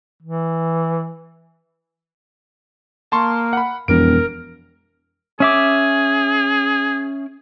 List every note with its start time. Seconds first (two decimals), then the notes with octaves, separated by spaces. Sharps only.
0.23 E3
3.12 A#3 A5 C6 C#6
3.53 F#5 B5
3.88 E1 F2 F3 B3 A#4 D7
5.40 C#4 G#4 E5 D6